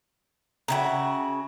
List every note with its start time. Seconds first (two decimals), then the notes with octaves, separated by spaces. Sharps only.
0.68 C#3 E4 F#4 G5 A#5